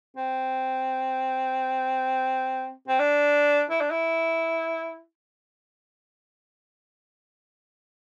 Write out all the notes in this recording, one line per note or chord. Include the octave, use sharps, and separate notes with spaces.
C4
C4
D4
E4
D4
E4